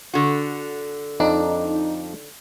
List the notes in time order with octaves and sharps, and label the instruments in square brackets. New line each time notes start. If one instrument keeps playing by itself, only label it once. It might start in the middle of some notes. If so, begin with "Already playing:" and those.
[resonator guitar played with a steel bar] D3 F#4
[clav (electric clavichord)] F2 D4 D5 [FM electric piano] D#4